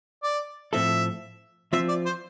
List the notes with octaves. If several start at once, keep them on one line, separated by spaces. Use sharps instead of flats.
D5
A2 F3 C4 F4 A4 E5
F3 C4 F4 E5
D5
C5